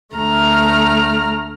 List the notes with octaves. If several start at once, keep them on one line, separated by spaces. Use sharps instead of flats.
D2 A3 A#5 F6